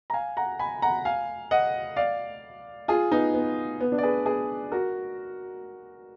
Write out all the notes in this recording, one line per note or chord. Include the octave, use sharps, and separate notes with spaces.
A#5
F5 G#5
F#5 A#5
G#5 B5
F#5 A#5
F5 G#5
D#5 F#5
D5 F5
F4 G#4
B3 D#4
B3
B3
D4
D5
G#4 B4
G#4 B4
F#4 A#4